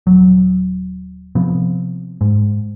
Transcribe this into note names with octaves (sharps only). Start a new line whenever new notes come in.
D#1 F#3
C3 F3 B3
G#2